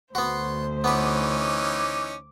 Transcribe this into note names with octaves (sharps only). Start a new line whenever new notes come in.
D2 B3 F#4 C5 C6
E3 B3 C#4 D#4 B4 D6